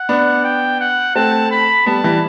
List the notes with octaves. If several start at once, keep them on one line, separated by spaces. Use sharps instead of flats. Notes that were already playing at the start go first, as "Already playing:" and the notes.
Already playing: F#5
B3 D4
G5
F#5
A3 C4 A5
B5
G3 B3 A5
E3 G3